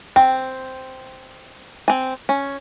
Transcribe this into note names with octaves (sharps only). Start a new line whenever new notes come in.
C4 G5
C4 G#5
C#4